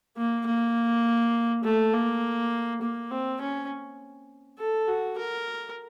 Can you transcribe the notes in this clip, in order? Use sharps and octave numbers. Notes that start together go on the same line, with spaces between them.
A#3
A#3
A3
A#3
A#3
C4
C#4
A4
F#4
A#4